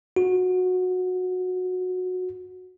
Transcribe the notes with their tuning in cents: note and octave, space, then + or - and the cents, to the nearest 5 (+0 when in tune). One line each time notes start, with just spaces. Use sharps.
F#4 -15